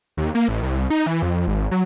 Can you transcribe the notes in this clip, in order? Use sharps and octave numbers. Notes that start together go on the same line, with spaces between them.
D#2
A#3
A1
C2
D#4
E3
F2
G#1
F#3